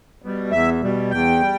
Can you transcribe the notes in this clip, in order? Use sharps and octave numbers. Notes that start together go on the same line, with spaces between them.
B2 G3
E2 E5
B2 G3
E2 G5
G3